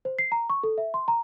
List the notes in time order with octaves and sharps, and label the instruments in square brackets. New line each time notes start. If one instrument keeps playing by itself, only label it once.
[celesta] C5
C7
A#5
C#6
A4
E5
C6
A#5